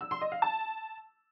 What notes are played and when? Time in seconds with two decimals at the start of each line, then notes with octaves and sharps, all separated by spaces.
0.01 E6
0.11 C6
0.21 D#5
0.32 F5
0.42 A5